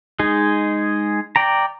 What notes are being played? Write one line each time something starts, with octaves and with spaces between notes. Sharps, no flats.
G#3 D#4 G#4
D5 G5 A#5